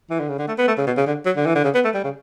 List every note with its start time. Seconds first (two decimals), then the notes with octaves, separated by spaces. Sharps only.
0.10 E3
0.20 D3
0.29 C#3
0.39 D3
0.48 A3
0.58 B3
0.67 A3
0.78 C#3
0.87 B2
0.97 C#3
1.07 D3
1.26 F#3
1.36 D3
1.46 E3
1.55 D3
1.64 C#3
1.74 B3
1.85 A3
1.94 G3
2.04 C#3